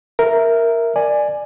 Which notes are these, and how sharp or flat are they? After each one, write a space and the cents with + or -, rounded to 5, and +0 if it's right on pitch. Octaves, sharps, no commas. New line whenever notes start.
A#4 +0 E5 +0
D5 +15 G#5 +0